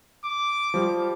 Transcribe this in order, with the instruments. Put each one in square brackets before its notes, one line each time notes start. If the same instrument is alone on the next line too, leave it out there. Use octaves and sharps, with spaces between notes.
[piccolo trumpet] D6
[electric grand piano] F3 G3